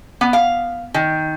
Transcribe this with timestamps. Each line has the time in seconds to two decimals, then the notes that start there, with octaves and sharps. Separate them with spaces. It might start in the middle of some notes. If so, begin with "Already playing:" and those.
0.21 B3
0.33 F5
0.94 D#3